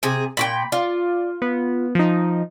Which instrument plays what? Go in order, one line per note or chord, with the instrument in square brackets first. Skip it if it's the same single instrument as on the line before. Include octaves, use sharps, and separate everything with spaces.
[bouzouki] C3 G#4
[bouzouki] A#2 F#4 G5 [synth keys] B5
[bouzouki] F4 [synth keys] D5
[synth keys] B3
F3 D#4